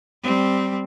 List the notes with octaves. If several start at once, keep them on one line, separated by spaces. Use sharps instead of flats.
G3 C4